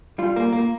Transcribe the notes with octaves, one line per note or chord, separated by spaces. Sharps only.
G3 F4
A#3
A#3